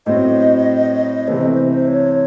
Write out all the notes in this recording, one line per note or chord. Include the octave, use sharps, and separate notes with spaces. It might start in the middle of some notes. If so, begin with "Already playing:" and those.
A2 F#3 C4 D#5
C3 E3 A3 C5
C#5